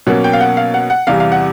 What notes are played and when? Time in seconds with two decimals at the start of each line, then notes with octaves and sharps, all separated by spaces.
0.07 B2 F#3 A#3 C#4 F#5
0.24 G5
0.33 F5
0.40 F#5
0.57 F5
0.74 F#5
0.90 F#5
1.07 E2 C3 E3 G3 F5
1.20 F5
1.32 F#5